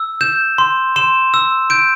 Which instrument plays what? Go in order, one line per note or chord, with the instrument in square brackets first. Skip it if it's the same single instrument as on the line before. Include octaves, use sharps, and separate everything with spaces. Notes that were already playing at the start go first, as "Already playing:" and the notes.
Already playing: [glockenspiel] E6
G6 E7
C6
C6 E7
E6
G6 D7